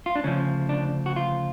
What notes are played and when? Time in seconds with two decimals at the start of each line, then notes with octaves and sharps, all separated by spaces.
0.06 F4
0.15 D4
0.24 D2 C#3 F3 C#4
0.69 D4
1.06 F#4
1.16 F4